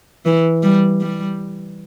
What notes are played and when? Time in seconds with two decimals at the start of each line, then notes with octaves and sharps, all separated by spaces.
0.25 E3
0.63 G3
1.01 G3